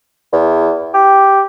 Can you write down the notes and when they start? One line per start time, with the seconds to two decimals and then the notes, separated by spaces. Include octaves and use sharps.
0.32 E2
0.94 G4